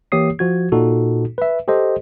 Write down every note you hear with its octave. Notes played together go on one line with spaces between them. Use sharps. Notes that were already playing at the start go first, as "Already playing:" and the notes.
E3 A#3 G4 C#5 D#6 C7
F3 F#4 G#6
A#2 D#4 F#4 A4
B4 E5
G4 A4 C5 D#5